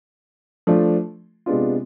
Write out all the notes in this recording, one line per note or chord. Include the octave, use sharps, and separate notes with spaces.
F3 A3 D4 F4
C3 G#3 B3 D4 F4